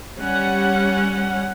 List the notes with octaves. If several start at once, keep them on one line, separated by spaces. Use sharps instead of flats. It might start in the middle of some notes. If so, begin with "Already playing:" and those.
G3 C#4 F#5